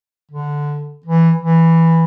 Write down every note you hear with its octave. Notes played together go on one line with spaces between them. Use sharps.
D3
E3
E3